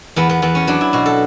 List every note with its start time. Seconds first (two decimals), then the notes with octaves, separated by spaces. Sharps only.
0.16 E2 B3
0.29 B3
0.42 E2 B3
0.55 C#4
0.67 F#3 D4
0.81 E4
0.93 B2 F#4
1.06 A4